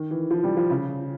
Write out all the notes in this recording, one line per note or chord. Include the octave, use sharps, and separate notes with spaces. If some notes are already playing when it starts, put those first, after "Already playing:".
Already playing: D#3
E3
F3
G3
F3
C#3